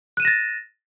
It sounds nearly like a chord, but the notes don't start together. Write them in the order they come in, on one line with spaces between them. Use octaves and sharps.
F#6 D#7 E7 A#6 A6